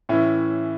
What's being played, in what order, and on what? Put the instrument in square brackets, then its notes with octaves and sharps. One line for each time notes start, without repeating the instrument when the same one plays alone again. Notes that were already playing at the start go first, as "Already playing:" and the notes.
[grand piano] A2 E3 C#4 E4